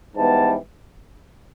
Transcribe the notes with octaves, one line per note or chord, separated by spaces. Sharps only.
G#2 E3 G3 B3 A5